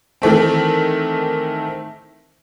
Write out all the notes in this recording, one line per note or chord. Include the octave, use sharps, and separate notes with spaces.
D#3 E3 A3 C4